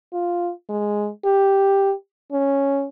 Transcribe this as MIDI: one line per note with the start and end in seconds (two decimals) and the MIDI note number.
0.13 0.51 65
0.69 1.09 56
1.25 1.93 67
2.32 2.87 61